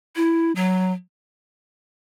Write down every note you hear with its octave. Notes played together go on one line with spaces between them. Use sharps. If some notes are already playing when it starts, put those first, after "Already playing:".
E4
F#3